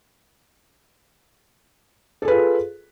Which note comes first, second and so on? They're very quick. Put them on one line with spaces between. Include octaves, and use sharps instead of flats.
A4 G#4 B4 F4